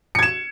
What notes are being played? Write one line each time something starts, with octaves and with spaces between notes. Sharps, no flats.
G#6 C#7 E7